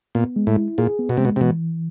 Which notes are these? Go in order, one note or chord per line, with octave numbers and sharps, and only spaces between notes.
A#2 B3
G#3
A2
E4
A#2 G#4
B3
B2
C3 G#3
B2
C3
B2 E3